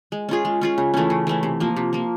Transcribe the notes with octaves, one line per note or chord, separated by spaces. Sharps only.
G#3
C#4 F4 G#4
G#3
C#4 F4 G#4
C#3
E3 A3 C#4
C#3
E3 A3 C#4
C3
F3 A#3
C3
F3 A#3